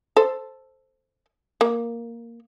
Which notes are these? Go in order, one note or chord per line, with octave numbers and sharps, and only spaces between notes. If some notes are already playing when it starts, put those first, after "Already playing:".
A4 C5
A#3